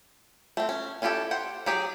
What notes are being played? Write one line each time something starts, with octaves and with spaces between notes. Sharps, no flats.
A3 C4
C#4
C#4 E4 F4 G4 A4
C5 F#5 G5
F#3 G4 G#4